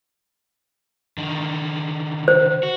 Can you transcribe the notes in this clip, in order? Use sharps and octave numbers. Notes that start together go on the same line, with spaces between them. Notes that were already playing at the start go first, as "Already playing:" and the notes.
D3 D#3
C5
F#4